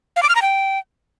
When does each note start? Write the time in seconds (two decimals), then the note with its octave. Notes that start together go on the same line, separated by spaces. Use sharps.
0.16 F5
0.23 D6
0.29 F6
0.36 A#5
0.42 G5